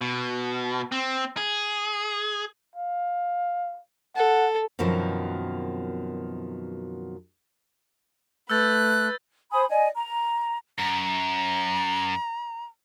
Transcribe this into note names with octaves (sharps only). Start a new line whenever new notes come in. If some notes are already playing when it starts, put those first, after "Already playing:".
B2
C4
G#4
F5
A4 F#5
F#2 B2 D#3 F3 C4
A3 B4 E6 F#6 G6 A6
C5 G#5 B5 D#6
D5 D#5 G#5
A#5
F#2 A#5